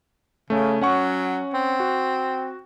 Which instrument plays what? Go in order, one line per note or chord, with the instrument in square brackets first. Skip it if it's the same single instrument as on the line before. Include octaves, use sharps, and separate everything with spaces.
[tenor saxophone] C#3 [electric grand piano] A3 C#4
[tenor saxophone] F#3 [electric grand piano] C#4 F#5 C#6
[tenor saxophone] C4
[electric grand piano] F#4